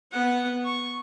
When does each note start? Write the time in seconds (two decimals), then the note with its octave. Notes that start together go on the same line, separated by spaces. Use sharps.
0.12 B3 F#5
0.64 C#6